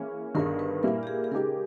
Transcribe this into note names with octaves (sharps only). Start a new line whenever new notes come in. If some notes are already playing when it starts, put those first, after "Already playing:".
Already playing: E3 A#3 C#4 G#4
G1 G2 D#3 A#4
B4
A#2 G3 A#3 E4 A#4
G4
G#4
G#4
C#3 G#3 D#4 G4 A#4